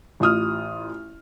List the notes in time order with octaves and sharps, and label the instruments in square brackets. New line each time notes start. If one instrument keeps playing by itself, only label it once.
[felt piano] A1 F4 D#6 F6